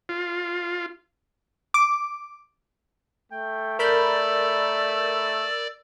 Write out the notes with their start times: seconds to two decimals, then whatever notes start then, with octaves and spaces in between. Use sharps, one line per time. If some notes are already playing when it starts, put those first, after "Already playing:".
0.09 F4
1.74 D6
3.32 A3 G5
3.79 A#4 D5 B5 E6 G6